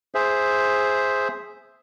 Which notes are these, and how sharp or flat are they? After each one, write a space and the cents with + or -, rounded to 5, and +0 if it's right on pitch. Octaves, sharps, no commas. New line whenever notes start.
G#4 +0 C5 +0 E5 +0